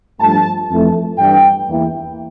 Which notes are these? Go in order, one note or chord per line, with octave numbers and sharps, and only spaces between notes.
G2 F3 A3 A5
F2 E3 A3
G2 E3 G3 G5
E2 E3 A#3 E4